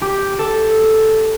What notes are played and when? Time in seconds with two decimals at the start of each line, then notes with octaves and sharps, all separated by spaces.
0.02 G4
0.39 A4